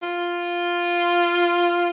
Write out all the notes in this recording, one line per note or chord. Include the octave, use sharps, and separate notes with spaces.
F4